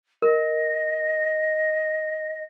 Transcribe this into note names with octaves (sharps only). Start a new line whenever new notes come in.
A#4 D#5